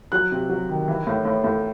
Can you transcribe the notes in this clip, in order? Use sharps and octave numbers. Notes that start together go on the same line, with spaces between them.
F#3 F#6
C3
F#3
D#3
E3
A2
A2
A2